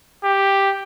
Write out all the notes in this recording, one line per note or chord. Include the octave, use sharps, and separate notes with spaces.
G4